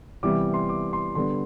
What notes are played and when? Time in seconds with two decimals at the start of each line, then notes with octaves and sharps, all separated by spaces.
0.23 C3 E3 G3 B3 D6
0.54 C6
0.69 D6
0.93 C6
1.15 D3 G3 B3 D4 C6